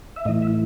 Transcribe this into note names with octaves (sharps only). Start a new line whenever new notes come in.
E5
A2 E3 D#5
E5